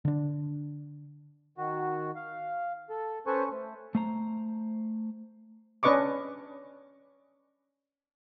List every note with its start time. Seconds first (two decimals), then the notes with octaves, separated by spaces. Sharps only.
0.05 D3 D4
1.58 D#3 F#4
2.16 F5
2.90 A4
3.27 C#4 A4 B4 C5 G#5 C#6
3.51 A3
3.95 A3 C5 A#5
5.83 C#4 D4 B4 D#5 C#6 D6